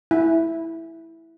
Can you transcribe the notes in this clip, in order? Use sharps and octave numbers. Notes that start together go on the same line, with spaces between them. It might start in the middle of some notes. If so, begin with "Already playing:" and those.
E4